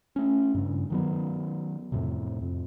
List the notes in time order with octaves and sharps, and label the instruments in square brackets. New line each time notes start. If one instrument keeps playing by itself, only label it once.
[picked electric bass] A3 C#4
G2 C#3
D#3 F#3 B3
F2 A2 C3
F2